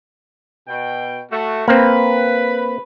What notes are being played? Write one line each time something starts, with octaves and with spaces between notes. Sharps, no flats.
B2 G5
A3 F#4
A#3 C4 B4 B5